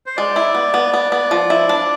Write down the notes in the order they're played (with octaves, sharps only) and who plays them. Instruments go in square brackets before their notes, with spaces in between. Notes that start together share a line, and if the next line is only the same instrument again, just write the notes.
[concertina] C5
[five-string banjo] G#3 [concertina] D5
[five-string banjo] E4
B3
B3
B3
B3
F3
E4
D4